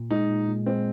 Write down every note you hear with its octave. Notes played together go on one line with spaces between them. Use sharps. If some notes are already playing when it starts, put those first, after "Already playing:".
Already playing: A#2
G#3 D#4
A#2
A#2
G#3 C4